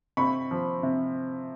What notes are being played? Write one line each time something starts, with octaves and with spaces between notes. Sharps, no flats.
C3 B5 C#6
F3
C3